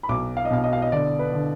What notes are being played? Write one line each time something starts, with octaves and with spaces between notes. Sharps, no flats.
B5
B1 D6
F5
D#5
B2 F5
D#5
F5
D#5
D3 D5
B4
D3